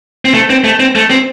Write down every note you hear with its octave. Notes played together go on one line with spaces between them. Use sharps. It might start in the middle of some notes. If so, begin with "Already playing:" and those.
C4
A3
C4
A3
C4
A3
C4